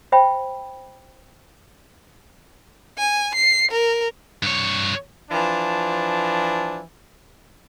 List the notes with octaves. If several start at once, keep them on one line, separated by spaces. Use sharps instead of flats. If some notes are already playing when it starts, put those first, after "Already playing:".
C5 E5 G5 B5
G#5
C7
A#4
G2 C#5
E3 F3 D4